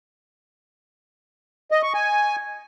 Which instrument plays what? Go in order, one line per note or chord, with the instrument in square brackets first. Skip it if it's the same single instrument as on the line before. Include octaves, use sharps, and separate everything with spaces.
[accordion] D#5
C#6
G#5